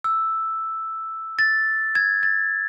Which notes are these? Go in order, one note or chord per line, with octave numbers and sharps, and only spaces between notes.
E6
A6
G#6
A6